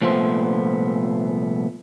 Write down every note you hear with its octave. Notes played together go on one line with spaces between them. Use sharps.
C2 A#2 F3 A3 B3 C5